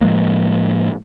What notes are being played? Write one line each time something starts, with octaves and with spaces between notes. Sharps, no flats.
A2 F3 G#3 A#3